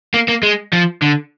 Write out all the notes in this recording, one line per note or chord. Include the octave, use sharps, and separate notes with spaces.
A#3
A#3
G#3
F3
D3